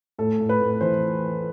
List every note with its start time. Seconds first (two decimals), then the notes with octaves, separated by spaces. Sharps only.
0.19 A2 A4
0.40 A2
0.49 B4
0.61 A2
0.81 E3 C5